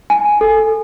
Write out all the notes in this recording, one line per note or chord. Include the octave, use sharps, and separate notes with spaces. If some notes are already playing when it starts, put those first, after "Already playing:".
G#5
A4